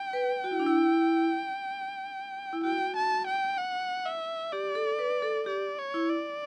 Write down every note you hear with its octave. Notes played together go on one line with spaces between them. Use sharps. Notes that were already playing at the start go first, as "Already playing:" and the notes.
Already playing: G5
B4
F#4
E4
D4
E4
E4
F#4 G5
A5
G5
F#5
E5
G4 D5
A4
B4
A4
G4 D5
C#5
E4
D5